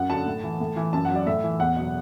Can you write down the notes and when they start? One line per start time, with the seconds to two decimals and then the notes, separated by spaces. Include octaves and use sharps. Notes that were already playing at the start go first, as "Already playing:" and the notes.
Already playing: F#2 F#5
0.10 D3 F#3 A5
0.26 A2
0.44 E3
0.60 A2
0.77 E3
0.93 F#2 A5
1.05 F#5
1.10 F#3
1.16 D5
1.26 A2 E5
1.44 E3
1.60 E2 F#5
1.77 B2 F#3